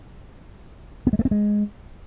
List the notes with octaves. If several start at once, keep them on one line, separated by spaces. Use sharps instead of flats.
B3
G#3
A3
C4
G#3